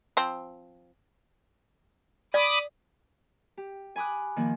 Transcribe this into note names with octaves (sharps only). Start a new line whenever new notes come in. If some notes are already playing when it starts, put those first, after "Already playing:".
F3 C4
D5 B5 D6 D#6
G4
G#5 B5 D6 D#6 F#6
D#3 F3 A#3